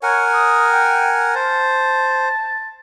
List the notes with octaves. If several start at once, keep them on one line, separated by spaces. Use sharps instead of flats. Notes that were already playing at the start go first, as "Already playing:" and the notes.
A#4 C#5 F#5 G#5
D#6
G5
C5 A5